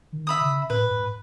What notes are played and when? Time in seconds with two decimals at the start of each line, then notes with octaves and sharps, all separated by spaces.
0.13 D#3
0.27 E5 B5 D#6
0.41 C#3
0.70 A2 B4
0.91 G#2